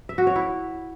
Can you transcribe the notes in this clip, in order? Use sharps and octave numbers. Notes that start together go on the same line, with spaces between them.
E5
F#4
C#5
E4